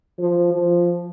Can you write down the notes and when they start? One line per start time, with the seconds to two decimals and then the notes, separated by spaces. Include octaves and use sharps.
0.18 F3
0.54 F3